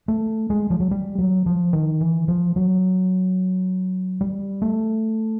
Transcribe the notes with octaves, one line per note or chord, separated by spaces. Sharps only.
A3
G#3
F3
F#3
G3
F#3
F3
D#3
E3
F3
F#3
G3
A3